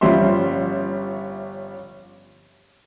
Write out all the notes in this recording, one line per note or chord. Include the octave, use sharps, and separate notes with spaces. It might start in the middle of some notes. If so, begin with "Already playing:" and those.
G1 F3 G3 C#4 E5 C6